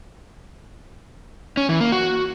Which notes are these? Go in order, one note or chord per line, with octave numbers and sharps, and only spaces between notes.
C#4
E3
A#3
F#4